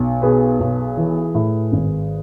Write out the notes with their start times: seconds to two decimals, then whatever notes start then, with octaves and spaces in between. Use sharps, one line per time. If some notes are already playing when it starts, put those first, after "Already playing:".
Already playing: B1
0.22 B2 G#4 B4
0.60 B1
0.97 E3
1.34 A2
1.72 G#1